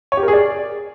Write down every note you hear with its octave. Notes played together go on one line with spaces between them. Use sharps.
C#5
G4
A#4
G#4
D5